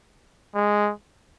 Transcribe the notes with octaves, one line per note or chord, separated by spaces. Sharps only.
G#3